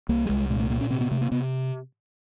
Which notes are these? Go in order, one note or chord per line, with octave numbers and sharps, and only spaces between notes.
C2 A#3
G3
C2 G#3
A#2 G#3
A3
A#2 A#3
C#4
C3 C4
B3
C3 A3
A#3
C3 B3